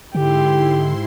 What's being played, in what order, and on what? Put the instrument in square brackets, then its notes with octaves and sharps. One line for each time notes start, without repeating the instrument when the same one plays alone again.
[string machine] G#2 E4 C6 [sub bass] D3 [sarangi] G4